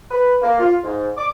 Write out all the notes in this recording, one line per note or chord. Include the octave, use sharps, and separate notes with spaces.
B4
A#3
F4
G#2
D6